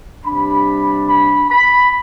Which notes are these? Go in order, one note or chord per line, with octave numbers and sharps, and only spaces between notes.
C3 G3 D4 B5
B5
B5